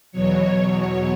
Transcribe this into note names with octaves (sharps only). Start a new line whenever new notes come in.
E2 B2 F#3 C#5